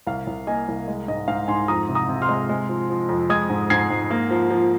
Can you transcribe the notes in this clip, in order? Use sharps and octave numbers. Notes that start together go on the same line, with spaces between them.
C2 F5
C2
A#3 D#5 G#5
C2
G#3
G#2 D#5
G#2 F5
G#2 G#5 C6
F2 A#5 D#6
C3
A#5 D#6
C3
C6 F6
G#3
G#3
F3
F3
F2
G#3 D#6 G#6
G#2
G#2 G#6 C7
G#2
A#3
F3
F3